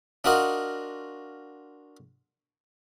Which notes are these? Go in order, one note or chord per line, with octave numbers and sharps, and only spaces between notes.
D4 F4 F#4 A#4 D#5